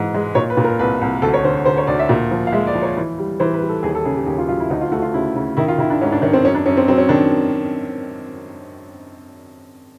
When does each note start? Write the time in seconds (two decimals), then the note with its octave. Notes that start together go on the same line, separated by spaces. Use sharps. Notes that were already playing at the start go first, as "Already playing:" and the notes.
Already playing: G#2 E3
0.14 G#3
0.35 A#2 C#5
0.50 B4
0.57 A#2
0.64 A#4
0.79 C2 B4
1.01 C2
1.22 D2 A4
1.34 C#5
1.44 D3 C5
1.65 D3 C5
1.77 C#5
1.87 D2 D5
1.99 E5
2.09 A#2
2.31 F3
2.47 F5
2.53 G#3 E5
2.67 D5
2.75 F3
2.82 C#5
2.97 E3
3.18 G3
3.40 E3 C5
3.54 B4
3.61 G3
3.69 A4
3.83 D#2 G#4
3.95 A4
4.05 C#3 G#4
4.16 G4
4.27 D#2 G4
4.38 F4
4.48 F#3 F4
4.60 E4
4.70 D2 D#4
4.81 F4
4.91 A3 F#4
5.02 F4
5.14 C#3 E4
5.36 C#3
5.57 D#3 E4
5.68 F4
5.78 D#3 E4
5.90 D4
6.01 G#2 C#4
6.12 D4
6.22 D#3 C#4
6.33 C4
6.45 F#2 C#4
6.54 D4
6.66 F#2 C#4
6.77 C4
6.88 F#3 C4
6.98 C#4
7.09 D#3 D4